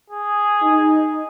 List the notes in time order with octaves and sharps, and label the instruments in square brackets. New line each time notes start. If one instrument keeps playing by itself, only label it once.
[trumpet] G#4
[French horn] D#4